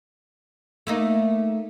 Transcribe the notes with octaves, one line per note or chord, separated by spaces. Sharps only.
A3 A#3 D#4